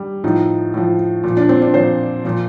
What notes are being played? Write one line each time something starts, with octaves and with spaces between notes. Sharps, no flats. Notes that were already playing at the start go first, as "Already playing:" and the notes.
Already playing: G3
A2 F3 D#4
A2 F3
A#2 F3
D4
C4
D4
A#2 F3 C5
A#2 F3